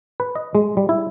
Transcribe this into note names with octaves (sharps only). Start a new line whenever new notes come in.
B4
D#5
G#3
G3
E4